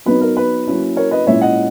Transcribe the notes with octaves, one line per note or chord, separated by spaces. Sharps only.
F#3 B3 D#4 B4
A#4
B4
F#3 A#3 C#4 E4
A#4 C#5
B4 D#5
A#2 G#3 C#4 E4 C#5 E5
D#5 F#5